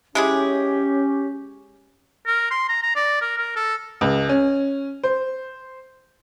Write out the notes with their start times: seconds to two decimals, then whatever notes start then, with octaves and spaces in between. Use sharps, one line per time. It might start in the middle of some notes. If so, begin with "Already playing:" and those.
0.15 G#3 C#4 E4 G4 G#4
2.26 A#4
2.51 C6
2.69 A#5
2.83 A#5
2.96 D5
3.21 A#4
3.38 A#4
3.56 A4
4.01 C#2
4.29 C#4
5.03 C5